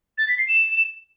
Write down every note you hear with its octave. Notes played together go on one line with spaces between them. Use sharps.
A6
B6
C7
E7